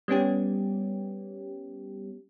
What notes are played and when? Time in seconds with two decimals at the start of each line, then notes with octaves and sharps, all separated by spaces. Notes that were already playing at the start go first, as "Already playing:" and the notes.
0.08 G3 B3 C#4 G4